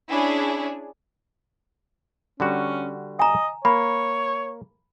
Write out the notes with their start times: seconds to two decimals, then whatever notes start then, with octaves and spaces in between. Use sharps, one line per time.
0.10 C#4 D4 E4 G#4
2.40 D3 G3 C#4 F#4
3.19 D#5 G#5 A#5
3.65 A#3 C#5 B5